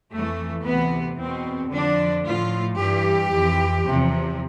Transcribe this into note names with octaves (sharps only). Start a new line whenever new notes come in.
F2 E3 A3
D2 C3 E3 B3
E2 B2 C4
F2 D3 F3 D4
A2 F3 F4
G2 E3 G4
F2 E3
E2 C3 F3